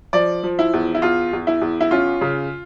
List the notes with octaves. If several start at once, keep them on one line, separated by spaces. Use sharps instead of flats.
F3 D5
F3
E4
E2
E4
E2 F4
E2
E4
E2
E4
C#4 F4
C#3